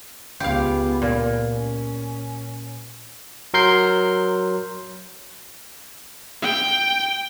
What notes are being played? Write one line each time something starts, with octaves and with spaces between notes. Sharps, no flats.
C#2 B3 G4 F5
A#2
C#4
F#3 A#4 C6 G6 C7
G5